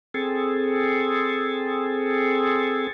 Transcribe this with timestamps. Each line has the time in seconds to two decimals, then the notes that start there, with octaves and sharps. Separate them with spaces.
0.14 C4 G#4 A4